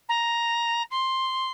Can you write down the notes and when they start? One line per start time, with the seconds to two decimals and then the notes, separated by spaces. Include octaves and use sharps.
0.09 A#5
0.91 C6